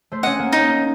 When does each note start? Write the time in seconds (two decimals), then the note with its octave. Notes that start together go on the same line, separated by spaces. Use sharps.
0.12 A3 C5
0.23 C#4 D#5 F#5
0.39 A#3
0.53 D#4